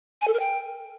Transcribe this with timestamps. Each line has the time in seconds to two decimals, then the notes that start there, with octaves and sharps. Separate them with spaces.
0.21 G#5
0.27 A4
0.33 A#4
0.39 G5